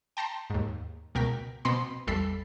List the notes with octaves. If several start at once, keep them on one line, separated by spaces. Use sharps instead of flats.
G5 A5 A#5 C6
D#2 G#2
C#2 B2 A#4 G5 B6
B2 B3 C4 B5 C6
A1 E2 G3 A4 B5 C7